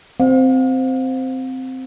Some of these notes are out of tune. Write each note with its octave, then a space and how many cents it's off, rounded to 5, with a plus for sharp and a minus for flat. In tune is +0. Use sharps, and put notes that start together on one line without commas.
C4 -10 F5 +40